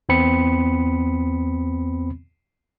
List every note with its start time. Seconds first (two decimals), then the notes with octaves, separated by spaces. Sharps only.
0.09 E2 B3 C4 B5 C#7